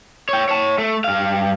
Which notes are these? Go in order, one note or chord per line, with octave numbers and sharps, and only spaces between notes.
C#5 G5
C#5 A5
A3
G2 F5